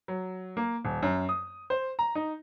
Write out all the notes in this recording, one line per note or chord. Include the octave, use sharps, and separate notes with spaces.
F#3
A#3
D#1
F#2
D#6
C5
A#5
D#4